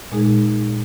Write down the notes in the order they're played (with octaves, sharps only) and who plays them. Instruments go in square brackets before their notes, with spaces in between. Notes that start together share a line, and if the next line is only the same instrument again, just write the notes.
[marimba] A#2 G#3 D#4 G#4